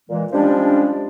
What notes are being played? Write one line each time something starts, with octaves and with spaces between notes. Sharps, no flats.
A#2 E3 G#3
F3 G3 G#3 C#4 D4